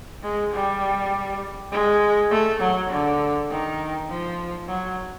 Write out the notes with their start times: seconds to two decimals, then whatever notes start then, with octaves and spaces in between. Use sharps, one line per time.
0.23 G#3
0.53 G3
1.72 G#3
2.31 A3
2.60 F#3
2.90 D3
3.50 D#3
4.09 F3
4.68 F#3